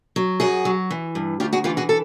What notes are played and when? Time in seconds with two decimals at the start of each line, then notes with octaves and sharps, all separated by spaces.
0.16 F#3
0.40 F#2 F#4 G#4
0.65 F#3
0.91 E3
1.15 G2
1.40 D2 F4 G4
1.53 F#4 G#4
1.64 E3 F4 G4
1.77 F#4 G#4
1.89 A4